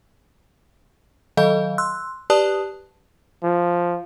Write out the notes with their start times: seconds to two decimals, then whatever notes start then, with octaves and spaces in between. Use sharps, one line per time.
1.37 D#3 F#3 A4 D#5 F5 G6
1.78 C6 E6 F#6
2.30 G4 B4 D5 A5 D#6 F#6
3.43 F3